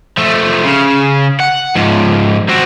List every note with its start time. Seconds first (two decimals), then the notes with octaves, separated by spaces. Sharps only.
0.17 F3 A3
0.64 C#3
1.40 F#5
1.75 G#2 F3
2.49 C4 F#4